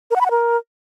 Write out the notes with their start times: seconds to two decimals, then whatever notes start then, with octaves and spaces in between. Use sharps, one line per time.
0.11 A#4
0.16 F#5
0.21 B5
0.26 F#5
0.31 A#4